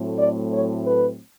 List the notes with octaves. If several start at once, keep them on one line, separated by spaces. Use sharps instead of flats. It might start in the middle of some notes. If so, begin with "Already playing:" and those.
Already playing: A2 F#3 A3 C4
D5
C#5
B4